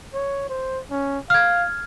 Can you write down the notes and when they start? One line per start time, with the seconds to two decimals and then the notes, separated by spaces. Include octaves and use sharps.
0.14 C#5
0.50 C5
0.91 C#4
1.30 F5 F6 G#6